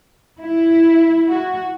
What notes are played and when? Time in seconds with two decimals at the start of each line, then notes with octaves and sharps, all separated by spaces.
0.41 E4
1.28 F#4